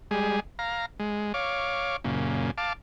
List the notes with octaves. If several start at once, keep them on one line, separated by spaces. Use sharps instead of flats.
G3 G#3 G#4
F5 A#5
G#3
C#5 F5 D6
F#2 A#2 C#3
F5 A5 D6